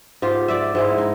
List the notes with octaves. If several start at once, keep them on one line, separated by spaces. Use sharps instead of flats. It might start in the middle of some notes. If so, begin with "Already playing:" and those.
G#2 F4 G4
D5 E5
G#2 G#3 E4
D#4